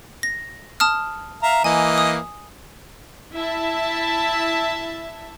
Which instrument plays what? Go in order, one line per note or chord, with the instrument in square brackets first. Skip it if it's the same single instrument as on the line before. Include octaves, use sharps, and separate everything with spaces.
[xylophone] A#6
A5 D#6 F6
[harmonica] E5 F5 A#5
[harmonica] E3 A#3 D#5 [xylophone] G#5
[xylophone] D#6
[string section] E4 E5 A5